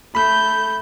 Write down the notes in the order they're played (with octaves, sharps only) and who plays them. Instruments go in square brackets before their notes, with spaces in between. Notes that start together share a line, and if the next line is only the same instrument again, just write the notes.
[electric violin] A3 G6 [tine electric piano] B5